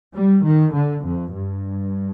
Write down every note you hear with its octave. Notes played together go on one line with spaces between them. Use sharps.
G3
D#3
D3
F2
G2